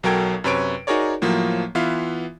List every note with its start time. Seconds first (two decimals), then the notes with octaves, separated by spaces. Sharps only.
0.03 B1 F#3 A4 A#4 G5 G#6
0.44 F#2 C3 B4 C#5 C#6 D7
0.87 D#4 F#4 G#4 A#4 C#5 D5
1.22 A2 F3 F#3 A#3
1.75 E3 B3 F4 E5 F5